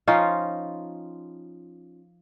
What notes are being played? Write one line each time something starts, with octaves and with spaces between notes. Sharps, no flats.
F3 C#4 D#4 F4